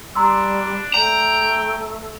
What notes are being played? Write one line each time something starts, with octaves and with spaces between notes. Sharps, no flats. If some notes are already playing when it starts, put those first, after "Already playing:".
G3 D4 A#5 C6 E6
A3 D5 G5 A#5